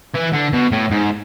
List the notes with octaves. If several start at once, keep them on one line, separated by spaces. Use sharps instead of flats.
E3
D3
B2
A2
G#2